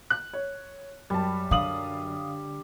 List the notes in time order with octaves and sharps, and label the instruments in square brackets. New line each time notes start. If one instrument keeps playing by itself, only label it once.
[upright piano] F#6
[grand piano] C#5
[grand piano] F#2 A5 [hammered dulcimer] G3
[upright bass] D3 [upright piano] F5 D#6 F#7